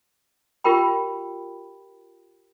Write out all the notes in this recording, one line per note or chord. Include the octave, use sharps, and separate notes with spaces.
F4 G4 A#4 G5 B5